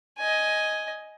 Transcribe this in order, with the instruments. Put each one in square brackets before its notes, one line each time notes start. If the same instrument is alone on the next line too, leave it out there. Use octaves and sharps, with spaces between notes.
[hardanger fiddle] D#5 G#5